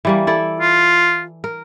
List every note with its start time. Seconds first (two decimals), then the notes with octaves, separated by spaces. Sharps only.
0.05 E3 G3 A#3
0.27 E4 A4 D5
0.60 F4
1.44 A#4